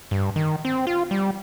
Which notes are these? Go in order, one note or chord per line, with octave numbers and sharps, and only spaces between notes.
G2
D#3
C4
F4
G3